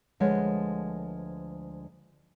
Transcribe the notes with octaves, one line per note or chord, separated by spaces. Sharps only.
D2 F3 G#3 B4 C#5 F#5